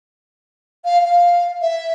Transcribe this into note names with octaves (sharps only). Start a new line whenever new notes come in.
F5
F5
E5